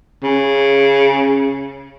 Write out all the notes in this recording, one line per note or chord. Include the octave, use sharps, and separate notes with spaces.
C#3